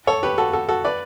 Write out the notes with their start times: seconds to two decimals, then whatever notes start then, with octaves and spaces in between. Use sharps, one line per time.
0.07 A4 C#5
0.23 G4 B4
0.38 F#4 A4
0.53 F#4 A4
0.68 F#4 A4
0.85 B4 D5